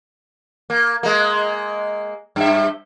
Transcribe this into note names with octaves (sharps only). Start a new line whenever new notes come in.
A#3
G#3 A#3
G2 E5